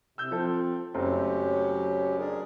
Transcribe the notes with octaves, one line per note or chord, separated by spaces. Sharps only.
C3 E6 G6
F3 C4 A4
F#1 F#3 A3 C4 C#4 G4
D4 G#4 A#4